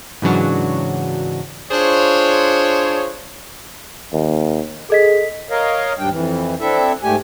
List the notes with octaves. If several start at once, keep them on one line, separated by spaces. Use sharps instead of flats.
G#2 C#3 E3 F#3 D4 F#4
D4 F4 G#4 C5 C#5
D#2
G#4 A4 D#5 B6
A#4 C#5 D#5 F5
D#2 G#2 G3 D4 G5
F2 E3
C4 D4 E4 A4 E5
G#2 A3 G4 G#5